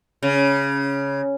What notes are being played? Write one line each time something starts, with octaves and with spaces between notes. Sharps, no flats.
C#3